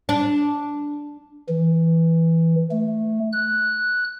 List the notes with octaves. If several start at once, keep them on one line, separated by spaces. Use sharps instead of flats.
D4
E3
A3
F#6